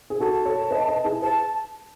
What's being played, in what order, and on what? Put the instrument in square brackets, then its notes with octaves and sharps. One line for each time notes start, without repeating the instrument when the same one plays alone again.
[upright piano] G#4
[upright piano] F#4 A4 [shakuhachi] A5
[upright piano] A4 C#5
C#5
B4 D#5
B4 D#5
E4 G#4
[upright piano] G#4 B4 [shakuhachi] A5